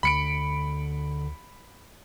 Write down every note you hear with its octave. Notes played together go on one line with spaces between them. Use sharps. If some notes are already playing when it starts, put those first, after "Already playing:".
D2 D3 B5 C#7 D7